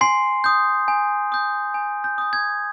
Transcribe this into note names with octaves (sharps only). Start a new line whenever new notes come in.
G#5 C6 C7
D#6 G6
G#5
D#6 G6
G#5
G6
D#6 G6
G#6